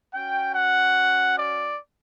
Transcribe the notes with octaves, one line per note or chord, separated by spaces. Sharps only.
C#4 F#4 G5
F#5
D5